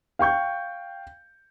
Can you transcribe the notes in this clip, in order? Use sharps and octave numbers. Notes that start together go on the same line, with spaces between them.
F5 G5 C#6 G6